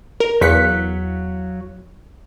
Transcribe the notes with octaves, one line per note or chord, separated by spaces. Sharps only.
A#4
E2 F#3 F5 F#6 B6 C#7